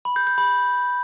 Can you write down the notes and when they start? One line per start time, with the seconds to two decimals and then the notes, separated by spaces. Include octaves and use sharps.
0.05 B5
0.16 G6
0.27 G6
0.38 B5